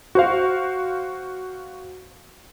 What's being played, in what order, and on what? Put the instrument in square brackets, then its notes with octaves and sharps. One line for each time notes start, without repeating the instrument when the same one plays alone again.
[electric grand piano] F#4 C5 F5